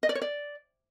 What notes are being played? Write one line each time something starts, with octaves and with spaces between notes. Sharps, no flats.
D#5
D5
C#5
D5